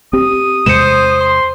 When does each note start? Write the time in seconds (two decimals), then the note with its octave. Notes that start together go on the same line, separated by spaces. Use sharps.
0.13 C4 G4 D#6
0.66 E2 C3 G#3 C5 C#7 E7
1.20 C6